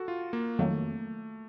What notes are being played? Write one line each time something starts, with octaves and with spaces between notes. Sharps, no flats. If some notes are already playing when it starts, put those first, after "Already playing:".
Already playing: F#4 A4
F4
A#3
F2 D#3 F#3 A3 A#3